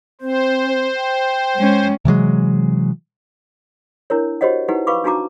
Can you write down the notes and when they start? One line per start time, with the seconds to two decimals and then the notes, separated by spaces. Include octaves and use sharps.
0.21 C4 C5
0.96 G5
1.56 G#3 C#4
2.05 C3 E3 F#3 G#3
4.10 D4 E4 A#4 C#5
4.41 F#4 G4 C5 C#5 D#5 F#5
4.69 D#4 E4 G4 B4 F#5
4.87 B4 F5 B5 C#6 D6
5.04 D4 D#4 F#4 A5 A#5 D6